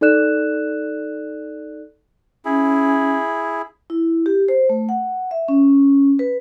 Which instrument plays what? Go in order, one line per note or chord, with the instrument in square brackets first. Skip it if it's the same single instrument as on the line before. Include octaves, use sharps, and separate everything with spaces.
[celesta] D#4 A4 D5 F#6 E7
[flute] C#4 [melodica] E4 G#4
[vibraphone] E4
G4
C5
A3
F#5
E5
C#4
B4